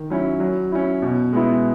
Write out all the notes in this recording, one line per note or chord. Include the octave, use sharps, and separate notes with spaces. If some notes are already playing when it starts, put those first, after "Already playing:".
Already playing: D#3
F#3 C#4 E4
F#3
C#4 E4
B2
G#3 B3 E4